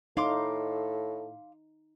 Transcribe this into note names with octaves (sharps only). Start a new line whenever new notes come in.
A2 D#4 A4 F5 C6 D6